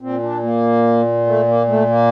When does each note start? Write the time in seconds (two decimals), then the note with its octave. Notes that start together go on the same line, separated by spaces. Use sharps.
0.01 A#2 C4
0.23 D4
0.43 A#3
1.27 A3
1.48 A#3
1.68 A3
1.89 A#3